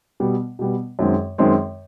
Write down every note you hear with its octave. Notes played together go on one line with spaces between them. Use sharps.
B2 G3 B3
B2 G3 B3
F#2 D#3 G#3 C4
F#2 D#3 G#3 C4